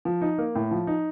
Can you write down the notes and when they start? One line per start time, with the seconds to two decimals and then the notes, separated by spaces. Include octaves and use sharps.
0.05 F3
0.21 D#4
0.38 A#3
0.55 A2
0.71 F3
0.87 D#4